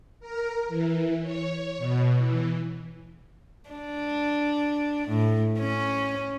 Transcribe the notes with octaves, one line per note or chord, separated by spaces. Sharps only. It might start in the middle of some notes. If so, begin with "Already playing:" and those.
A#4
E3
C#5
B2
E3
D4
A2
C#4